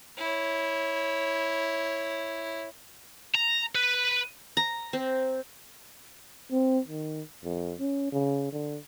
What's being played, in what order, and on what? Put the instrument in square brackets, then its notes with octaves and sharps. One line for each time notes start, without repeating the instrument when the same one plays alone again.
[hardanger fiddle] E4 C#5
[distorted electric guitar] A#5
B4
[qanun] A#5
C4
[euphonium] C4
D#3
F2
C#4
C#3
D3